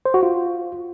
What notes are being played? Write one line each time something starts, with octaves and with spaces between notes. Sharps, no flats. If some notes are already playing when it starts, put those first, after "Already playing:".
C5
F#4
F4